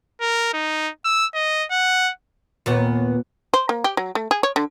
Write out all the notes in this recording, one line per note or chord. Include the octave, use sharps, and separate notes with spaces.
A#4
D#4
E6
D#5
F#5
D#2 A#2 B3
C5
A#3
G4
F#3
A3
G#4
C#5
D3